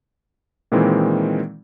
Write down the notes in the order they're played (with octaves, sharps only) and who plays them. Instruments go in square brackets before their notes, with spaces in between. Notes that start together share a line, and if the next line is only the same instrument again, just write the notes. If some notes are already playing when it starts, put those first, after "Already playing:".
[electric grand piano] A#2 D#3 E3 G#3 C4